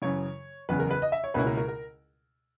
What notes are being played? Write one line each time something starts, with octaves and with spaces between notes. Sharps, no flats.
F#2 C#3 E3 C#5
F#1 E2 C#3 B4
A#4
B4
D#5
E5
C#5
C#2 B2 A#3 C#4 E4 B4
A#4
A#4
A#4